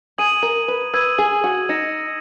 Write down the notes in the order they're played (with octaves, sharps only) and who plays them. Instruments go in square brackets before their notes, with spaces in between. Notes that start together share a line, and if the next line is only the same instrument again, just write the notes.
[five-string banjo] G#4 [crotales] D#6 G#6 D#7 F#7
[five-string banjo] A#4
B4
[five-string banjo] B4 [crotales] E6 G#6 D#7
[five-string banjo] G#4
F#4
[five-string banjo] D#4 [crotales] E6 A#6 C#7 E7